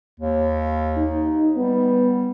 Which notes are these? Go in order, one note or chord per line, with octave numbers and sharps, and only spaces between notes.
D#2
D#4
G3 B3